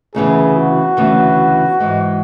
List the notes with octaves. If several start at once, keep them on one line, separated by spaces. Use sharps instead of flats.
D2 C#3 E3 B3 G#4
F#4
D2 C#3 E3 B3
G#2 E3 G#3